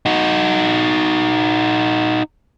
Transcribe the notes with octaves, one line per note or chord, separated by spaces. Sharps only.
D#4 F#4